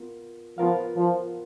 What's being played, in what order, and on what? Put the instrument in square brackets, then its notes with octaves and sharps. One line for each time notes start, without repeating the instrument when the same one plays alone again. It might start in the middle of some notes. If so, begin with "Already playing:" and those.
Already playing: [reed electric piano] B3 F4 A#4
[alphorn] F3 [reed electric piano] B3 F4 A#4 F5
[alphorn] F3